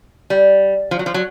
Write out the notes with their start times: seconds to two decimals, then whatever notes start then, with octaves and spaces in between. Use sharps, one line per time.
0.30 G3
0.91 F3
0.99 F#3
1.06 F3
1.14 F#3